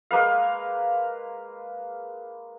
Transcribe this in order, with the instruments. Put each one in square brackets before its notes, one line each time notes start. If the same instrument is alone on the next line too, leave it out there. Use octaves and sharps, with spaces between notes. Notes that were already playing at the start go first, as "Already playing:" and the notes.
[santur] G#3 A#3 B4 F5